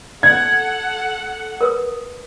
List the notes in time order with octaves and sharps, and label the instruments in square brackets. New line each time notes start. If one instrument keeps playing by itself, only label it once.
[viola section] A4 F#5 [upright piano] G#6
[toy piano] A#4 B4 D#6